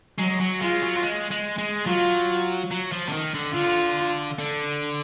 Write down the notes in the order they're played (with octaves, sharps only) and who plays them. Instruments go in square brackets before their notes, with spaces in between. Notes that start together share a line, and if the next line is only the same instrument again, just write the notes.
[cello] F#3 [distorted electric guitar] G#3
[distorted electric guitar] F#3
[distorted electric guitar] G#3 [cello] F4
[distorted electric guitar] F#3
G#3
G#3
G#3
[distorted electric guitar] F#3 [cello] F4
[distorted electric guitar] F#3
F3
D3
D#3
D3
[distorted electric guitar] D3 [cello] F4
[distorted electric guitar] D3